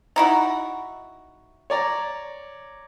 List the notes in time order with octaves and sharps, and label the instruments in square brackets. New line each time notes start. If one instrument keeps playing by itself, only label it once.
[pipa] D#4 E4 F#4
[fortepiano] C#5 D5 A#5